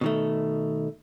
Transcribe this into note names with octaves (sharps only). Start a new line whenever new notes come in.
B2 D#3 A3